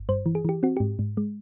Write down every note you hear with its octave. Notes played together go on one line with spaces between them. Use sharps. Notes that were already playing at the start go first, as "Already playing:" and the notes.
Already playing: G1
G2 C5
E3
G#4
E3 G4
C4 F#4
G#2 G4
G#2
G#3